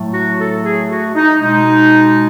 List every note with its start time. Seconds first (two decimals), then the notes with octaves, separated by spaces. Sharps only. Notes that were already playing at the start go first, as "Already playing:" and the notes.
Already playing: A2 F#3 A3
0.12 F#4
0.38 A4
0.63 G#4
0.89 F#4
1.15 D#4
1.40 B2 G#3 D#4